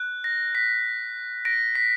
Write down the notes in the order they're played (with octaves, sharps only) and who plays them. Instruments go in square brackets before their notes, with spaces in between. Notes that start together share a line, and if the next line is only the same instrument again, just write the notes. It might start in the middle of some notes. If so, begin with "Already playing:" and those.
Already playing: [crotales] F#6
A#6
B6
A#6 D7
B6